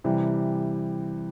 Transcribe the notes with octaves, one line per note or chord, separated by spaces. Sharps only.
C3 E3 G3